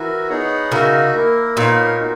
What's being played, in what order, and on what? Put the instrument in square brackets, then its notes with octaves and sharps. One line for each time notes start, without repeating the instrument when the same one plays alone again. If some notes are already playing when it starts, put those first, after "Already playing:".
Already playing: [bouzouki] E3 [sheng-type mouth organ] F#4 A#4 E5 G#5
[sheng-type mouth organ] B3 D#4 G#4 C#5 F#5
[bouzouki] C#3 [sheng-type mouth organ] D#4 F#4 A#4 E5 G#5
[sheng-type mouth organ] A#3 E4 A#4
[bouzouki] A#2 [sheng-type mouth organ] B3 D#4 A#4 C#5 G#5
[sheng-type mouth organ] A#3 D#4 F#4